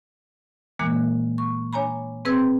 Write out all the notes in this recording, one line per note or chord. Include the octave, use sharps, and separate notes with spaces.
A#2 E3 G#3 A#3 F#6
C#6
D4 C#5 G#5 A#5 B5
C4 G#4 B4 C6 E6 G#6